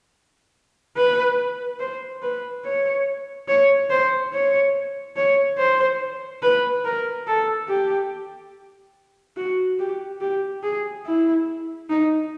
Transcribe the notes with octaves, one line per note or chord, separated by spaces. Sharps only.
B4
C5
B4
C#5
C#5
C5
C#5
C#5
C5
B4
A#4
A4
G4
F#4
G4
G4
G#4
E4
D#4